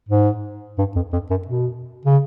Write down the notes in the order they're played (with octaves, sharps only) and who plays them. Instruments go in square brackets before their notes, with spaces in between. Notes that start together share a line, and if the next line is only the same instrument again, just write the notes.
[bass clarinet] G#2
G2
F2
F2
F#2
B2
C#3